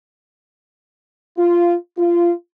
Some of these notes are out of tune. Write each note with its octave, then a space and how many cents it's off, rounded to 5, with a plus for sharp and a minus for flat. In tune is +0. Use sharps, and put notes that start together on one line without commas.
F4 -10
F4 -20